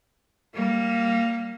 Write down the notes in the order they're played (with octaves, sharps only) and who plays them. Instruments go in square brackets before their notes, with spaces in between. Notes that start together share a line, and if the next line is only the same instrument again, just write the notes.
[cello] G3 A#3